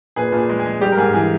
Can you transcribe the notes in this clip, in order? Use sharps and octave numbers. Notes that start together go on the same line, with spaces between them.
A#2 G#4 B4
A#2
G#4
G#3
G#4
G#3
G3 G4
A#4
G#2 G#4
E3 G#4